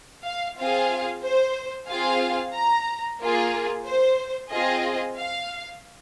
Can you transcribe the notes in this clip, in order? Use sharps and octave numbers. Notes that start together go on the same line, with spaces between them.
F5
C4 F4 G#4 F5
C5
C4 F4 G#4 F5
A#5
A#3 F4 G#4
C5
C4 F4 G#4 D#5
F5